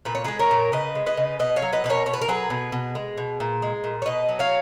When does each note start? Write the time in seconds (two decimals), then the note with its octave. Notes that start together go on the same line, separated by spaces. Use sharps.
0.05 A#2 B4
0.15 C#5
0.24 G#3 G#4 B4
0.39 A#4 C#5
0.51 A#2
0.72 C#3 B4 D#5
0.95 G#3
1.06 B4 D#5
1.17 C#3
1.39 B2 B4 D#5
1.56 C#5 F5
1.62 F#3
1.73 B4 D#5
1.84 B2 B4
1.90 A#4 C#5
2.06 B2 C#5
2.13 B4
2.22 A#4
2.28 F#3 G#4 B4
2.50 B2
2.72 B2
2.95 G#3
3.18 B2
3.40 A#2
3.62 G#3
3.84 A#2
4.02 C#5
4.06 B2 B4 D#5
4.29 F#3
4.39 C#5 F5